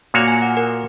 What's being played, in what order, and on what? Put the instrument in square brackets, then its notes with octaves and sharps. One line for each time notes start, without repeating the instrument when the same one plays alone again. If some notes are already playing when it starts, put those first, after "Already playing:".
[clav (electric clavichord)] A#2 A#3 F#4 C#5
[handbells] G#5
F#5
A#4